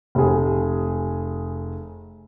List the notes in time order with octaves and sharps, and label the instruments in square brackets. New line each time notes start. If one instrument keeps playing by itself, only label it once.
[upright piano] F1 G#4